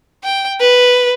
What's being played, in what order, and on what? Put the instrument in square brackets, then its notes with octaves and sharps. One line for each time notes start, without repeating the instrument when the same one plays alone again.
[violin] G5
B4